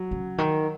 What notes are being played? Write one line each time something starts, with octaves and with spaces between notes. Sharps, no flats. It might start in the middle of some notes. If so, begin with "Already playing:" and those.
Already playing: F#3
C#3
D#3